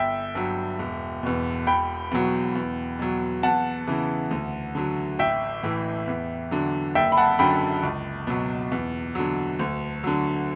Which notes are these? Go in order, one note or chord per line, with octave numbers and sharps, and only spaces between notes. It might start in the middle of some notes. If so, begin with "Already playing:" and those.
Already playing: G1 E5 G5
G2 F#3
E1
E2 B2
E1 G5 B5
E2 B2 F#3
E2
B2 F#3
E2 F#5 A5
C#3 E3
D2
D3 F#3
A1 E5 G5
A2 E3
E2
D3 F#3
F#1 E5 G5
B5
F#5 A5
F#2 D3 F#3 G5 B5
C#2
B2 F#3
E2
D3 F#3
D2
D3 F#3